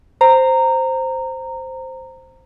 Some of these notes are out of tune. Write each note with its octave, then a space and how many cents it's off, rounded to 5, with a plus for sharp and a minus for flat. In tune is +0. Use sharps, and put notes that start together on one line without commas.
C5 +0 A#5 -15